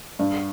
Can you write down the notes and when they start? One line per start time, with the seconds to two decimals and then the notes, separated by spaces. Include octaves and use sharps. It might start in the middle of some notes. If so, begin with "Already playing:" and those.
0.19 G2